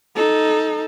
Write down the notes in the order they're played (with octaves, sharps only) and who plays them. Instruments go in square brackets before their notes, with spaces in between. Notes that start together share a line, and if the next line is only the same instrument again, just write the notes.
[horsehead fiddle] D#4 A4